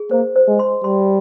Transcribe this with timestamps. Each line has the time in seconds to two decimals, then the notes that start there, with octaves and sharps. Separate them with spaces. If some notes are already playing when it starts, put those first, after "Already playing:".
Already playing: G#4
0.11 A#3 C5
0.36 C5
0.48 G#3
0.59 C6
0.84 G3 C6